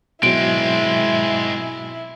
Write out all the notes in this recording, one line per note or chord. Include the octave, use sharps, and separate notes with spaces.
B2 F#3 G#3 C4 E4 D7